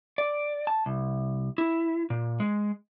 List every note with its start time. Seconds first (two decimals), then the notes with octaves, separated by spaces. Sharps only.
0.18 D5
0.67 A5
0.86 C2
1.58 E4
2.10 A#2
2.40 G#3